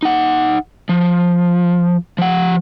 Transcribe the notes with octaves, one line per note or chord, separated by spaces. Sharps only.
D#4 F#5
F3
F3 F#5